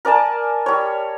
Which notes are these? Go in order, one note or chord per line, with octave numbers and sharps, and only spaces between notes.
A#4 D5 G#5 A5
G3 C#5